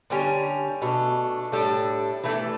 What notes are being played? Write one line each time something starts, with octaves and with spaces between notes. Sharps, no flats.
D3 G3 C#4
B2 A3 D4
A2 G3 D4 A4
E3 A3 D4 A4